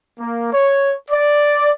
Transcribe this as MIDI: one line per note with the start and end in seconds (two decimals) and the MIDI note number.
0.18 0.49 58
0.52 0.93 73
1.10 1.73 74